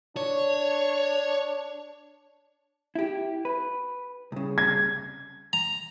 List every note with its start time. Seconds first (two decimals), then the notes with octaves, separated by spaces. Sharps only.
0.17 D4 C#5
2.95 E4 G4
3.45 B4
4.32 C2 C#3
4.58 G#6
5.53 A#5